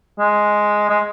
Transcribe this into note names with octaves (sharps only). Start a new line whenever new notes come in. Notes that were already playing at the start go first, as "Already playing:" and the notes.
G#3
G#3